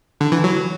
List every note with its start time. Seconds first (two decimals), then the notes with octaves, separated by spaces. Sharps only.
0.21 D3
0.32 E3
0.44 F#3